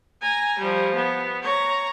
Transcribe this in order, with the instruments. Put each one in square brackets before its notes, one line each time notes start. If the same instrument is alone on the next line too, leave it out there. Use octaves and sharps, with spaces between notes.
[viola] G#5 A#5
F3 G3
B3
C#5 A#5